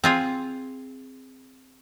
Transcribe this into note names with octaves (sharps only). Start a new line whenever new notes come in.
C4 F4 G#4